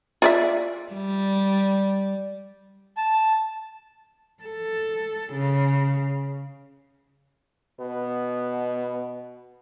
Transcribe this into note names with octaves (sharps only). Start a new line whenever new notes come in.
F4 D5 E5
G3
A5
A4
C#3
B2 B3